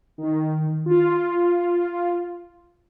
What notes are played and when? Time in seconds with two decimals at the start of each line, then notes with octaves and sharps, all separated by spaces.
0.18 D#3
0.86 F4